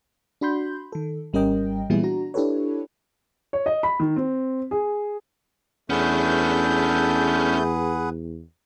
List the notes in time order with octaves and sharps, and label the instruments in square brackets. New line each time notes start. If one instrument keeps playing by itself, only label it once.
[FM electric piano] D4 F#4 B5 C6 G6
D#3 A4
G#1 G3 C#4 A#4 D#5 G5
A#2 E3 G3 B3 E4 G#4
D4 F#4 A#5
D4 E4 G4 A4 B4 C#5
[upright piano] C#5
D#5
B5
D#3
C4
G#4
[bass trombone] E2 [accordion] A3 G6 [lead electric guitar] C#4 D4 [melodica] G#4 B4 F#5